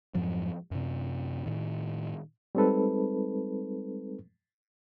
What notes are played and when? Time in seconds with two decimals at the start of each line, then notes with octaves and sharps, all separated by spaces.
0.14 F2 G#2 F3 F#3
0.71 F#2 C3
1.46 A2 D#3
2.55 G3 G#3 C4 D#4 A4 B4